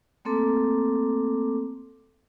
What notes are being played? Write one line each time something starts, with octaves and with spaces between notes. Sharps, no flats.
A3 A#3 C4 A4 D6